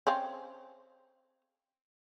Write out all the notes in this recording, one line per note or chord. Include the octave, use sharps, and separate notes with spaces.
C4 C#4 F5